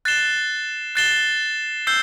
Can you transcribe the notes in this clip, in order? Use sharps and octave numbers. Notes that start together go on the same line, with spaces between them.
F#6 A6 C7 E7 G7
F#6 A6 C7 E7 G7
E6 G6 C7 G7